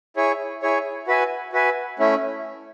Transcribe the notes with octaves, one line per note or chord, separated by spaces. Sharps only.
E4 G#4 C#5
E4 G#4 C#5
F#4 B4 E5 G#5
F#4 B4 E5 G#5
A3 C#4 E4